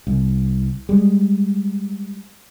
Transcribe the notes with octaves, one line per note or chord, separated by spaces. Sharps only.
C2
G3 G#3